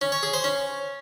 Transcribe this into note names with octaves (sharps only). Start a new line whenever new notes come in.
C#4
C#5
G#4
C5
C#4